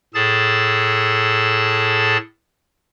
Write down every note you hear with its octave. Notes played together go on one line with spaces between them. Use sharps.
A2 G#4 A4 A5 A6